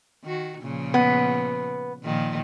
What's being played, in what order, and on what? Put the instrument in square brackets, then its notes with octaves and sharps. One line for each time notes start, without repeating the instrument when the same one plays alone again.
[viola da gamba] D#3 F#4
A#2 C#3 F3
[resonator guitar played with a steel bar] B3
[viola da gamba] A#2 D#3 F3